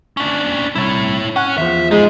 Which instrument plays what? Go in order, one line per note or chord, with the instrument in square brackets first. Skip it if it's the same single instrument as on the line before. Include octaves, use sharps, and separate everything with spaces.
[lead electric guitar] C#4 D4
[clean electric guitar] C2 [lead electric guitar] E4 C#5
[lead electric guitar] C#4 [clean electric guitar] F#5
[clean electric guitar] E2 F3 [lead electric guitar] E5
[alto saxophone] G#3 [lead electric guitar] D#4 G#4